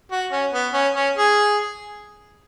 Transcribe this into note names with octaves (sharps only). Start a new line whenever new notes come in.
F#4
C#4
B3
C#4
C#4
G#4